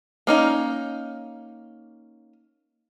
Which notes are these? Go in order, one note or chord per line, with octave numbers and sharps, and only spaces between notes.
A#3 C#4 D#4